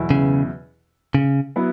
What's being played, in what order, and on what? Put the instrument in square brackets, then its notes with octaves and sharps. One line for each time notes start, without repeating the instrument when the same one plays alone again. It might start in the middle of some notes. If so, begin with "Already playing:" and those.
Already playing: [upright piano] E2 B2 F#3 E4
[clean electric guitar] C#3
C#3
[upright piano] F#3 B3 E4 B4